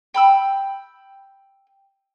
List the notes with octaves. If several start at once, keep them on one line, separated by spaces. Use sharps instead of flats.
G5 B5 E6